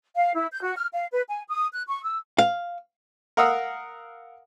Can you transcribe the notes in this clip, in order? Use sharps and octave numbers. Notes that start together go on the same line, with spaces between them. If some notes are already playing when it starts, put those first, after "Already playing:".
F5
E4
G6
F#4
F6
F5
B4
G#5
D#6
F#6
C#6
E6
F5
A#4 F5 F#5 D#6 E6